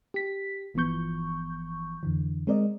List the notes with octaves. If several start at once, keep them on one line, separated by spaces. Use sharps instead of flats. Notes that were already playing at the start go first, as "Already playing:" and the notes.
G4 B6
G1 E3 F3 B3 C#6 G6
F2 D3 E3
G#3 C4 A#4 D5 D#5